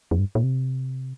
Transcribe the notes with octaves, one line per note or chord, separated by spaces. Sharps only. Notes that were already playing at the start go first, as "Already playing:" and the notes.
F2
G2
A#2
C3